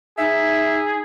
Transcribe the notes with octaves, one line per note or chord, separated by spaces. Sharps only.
D#4 G#4 E5